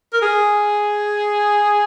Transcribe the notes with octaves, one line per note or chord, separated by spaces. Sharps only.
A#4
G#4